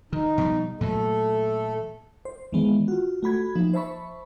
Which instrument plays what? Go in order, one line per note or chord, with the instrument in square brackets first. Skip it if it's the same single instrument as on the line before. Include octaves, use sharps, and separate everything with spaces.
[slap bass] D#3 [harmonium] D#4
[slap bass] B2 F3 G3
[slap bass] A#2 E3 F#3 [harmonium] A3 A4
[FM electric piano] C5
D#3 E3 G#3 B3
F4 F#4
A3 F#4 B5 G#6
F3 A#3 D#4
C5 E5 A5 B5 C#6